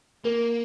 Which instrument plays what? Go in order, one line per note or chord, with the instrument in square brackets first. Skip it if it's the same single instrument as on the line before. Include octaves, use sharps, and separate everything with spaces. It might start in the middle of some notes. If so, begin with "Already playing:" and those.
[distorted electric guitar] A#3 [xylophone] A#4